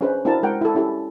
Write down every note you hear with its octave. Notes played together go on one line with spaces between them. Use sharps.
C#4 D4 G#4 B4 C5 D#5
C4 D4 E4 F#4 A#4 A5
G#3 A#4 F#5 G5
E4 A4
C#4 E4 G4 A4